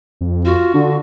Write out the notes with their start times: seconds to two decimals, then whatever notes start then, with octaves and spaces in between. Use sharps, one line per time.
0.21 F2
0.45 F4 F#4
0.74 D3 D4